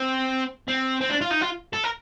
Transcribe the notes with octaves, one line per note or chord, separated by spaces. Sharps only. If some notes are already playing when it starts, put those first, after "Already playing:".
Already playing: C4
C4
C4
D4
F4
D#4
F4
A4
A#4